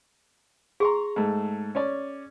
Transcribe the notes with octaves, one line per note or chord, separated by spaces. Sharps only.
G#4 A#5 C6 C#6
G#2 A3
C#4 C#5 D5